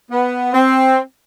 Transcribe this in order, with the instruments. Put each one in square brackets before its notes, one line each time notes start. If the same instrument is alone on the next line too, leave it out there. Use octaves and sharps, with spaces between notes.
[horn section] B3
C4